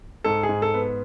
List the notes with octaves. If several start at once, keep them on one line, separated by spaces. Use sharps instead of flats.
G#2 A4
G#4
G#2
A4
B3